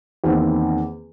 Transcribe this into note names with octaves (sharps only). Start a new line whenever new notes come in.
E2 D#3 A#3 C4